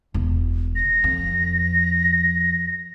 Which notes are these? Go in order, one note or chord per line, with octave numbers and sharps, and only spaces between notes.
E1
A#6
F2